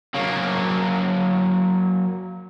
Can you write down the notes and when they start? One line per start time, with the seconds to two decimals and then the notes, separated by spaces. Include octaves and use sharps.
0.15 F#3 A#3